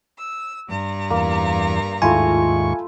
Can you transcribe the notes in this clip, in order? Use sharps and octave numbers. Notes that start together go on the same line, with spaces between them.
E6
G2 G3 A#5
E2 A#3
D#2 G#2 A3 E4 F4 G#5 C#6